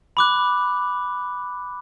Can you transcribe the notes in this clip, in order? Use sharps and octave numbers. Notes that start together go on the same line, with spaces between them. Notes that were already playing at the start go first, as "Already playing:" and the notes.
B5 D6 F#6